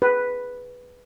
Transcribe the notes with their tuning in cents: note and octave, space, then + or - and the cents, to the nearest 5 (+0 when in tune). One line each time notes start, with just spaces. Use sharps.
G#4 +0 B4 +0